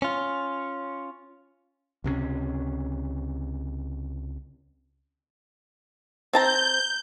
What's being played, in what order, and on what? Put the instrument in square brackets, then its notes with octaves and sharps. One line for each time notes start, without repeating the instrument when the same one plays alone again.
[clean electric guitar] C#4 F4
[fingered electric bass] C#2 C3 F3 C#4
[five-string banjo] C4 A5 A#5 [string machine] G6